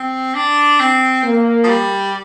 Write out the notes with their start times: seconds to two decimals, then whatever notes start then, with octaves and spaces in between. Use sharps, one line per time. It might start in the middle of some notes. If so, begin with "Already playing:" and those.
Already playing: C4
0.34 D4
0.80 C4
1.23 A#3
1.64 F3
1.68 G3